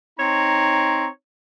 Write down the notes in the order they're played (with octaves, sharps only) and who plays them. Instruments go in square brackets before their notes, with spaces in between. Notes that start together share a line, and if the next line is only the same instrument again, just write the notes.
[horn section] C4 D#4 C#5 A#5